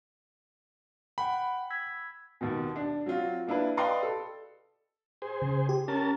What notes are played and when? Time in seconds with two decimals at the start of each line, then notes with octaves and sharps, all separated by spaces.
1.18 F#5 G5 B5
1.70 E6 G#6 B6
2.41 D#2 B2
2.76 D4
3.06 F#3 C4 F4 F#4
3.47 A#3 D4 E4 B4
3.77 B4 D5 D#5 F5 G5 C6
4.03 A4
5.22 G#4 C5
5.42 C#3
5.69 G4
5.88 C#4 A#4 A5